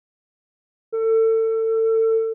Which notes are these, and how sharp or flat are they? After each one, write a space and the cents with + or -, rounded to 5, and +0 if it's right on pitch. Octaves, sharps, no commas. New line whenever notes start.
A4 +30